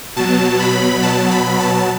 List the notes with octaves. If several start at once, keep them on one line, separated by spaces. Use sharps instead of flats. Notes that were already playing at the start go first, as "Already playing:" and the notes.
B2 F#3 A5
B5
B2 F#3 A5
B5
A5